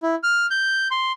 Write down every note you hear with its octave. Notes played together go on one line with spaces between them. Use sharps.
E4
F6
G6
C6